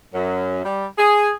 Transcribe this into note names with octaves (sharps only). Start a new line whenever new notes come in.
F#2
G3
G#4